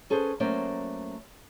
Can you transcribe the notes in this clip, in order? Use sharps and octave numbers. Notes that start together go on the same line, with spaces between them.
C#4 G#4 A4 B4 C5
F#3 A3 A#3 C#4 C5 D5